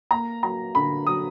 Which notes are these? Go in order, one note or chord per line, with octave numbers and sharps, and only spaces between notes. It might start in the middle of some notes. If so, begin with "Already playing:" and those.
A#3 A#5
F#3 A#5
D3 B5
F#3 D#6